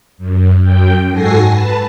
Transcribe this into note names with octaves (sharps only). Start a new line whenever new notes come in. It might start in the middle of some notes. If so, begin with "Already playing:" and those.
F#2
F#2 G5
G#2 F#4 A4 G#5 A#6 C7
B4 A5